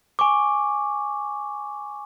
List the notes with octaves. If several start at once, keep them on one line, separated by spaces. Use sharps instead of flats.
G#5 C#6 D6